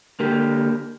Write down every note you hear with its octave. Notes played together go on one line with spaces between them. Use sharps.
D3 A#3 G4